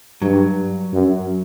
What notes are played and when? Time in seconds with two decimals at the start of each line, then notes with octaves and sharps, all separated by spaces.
0.21 G2 F#3
0.93 F#2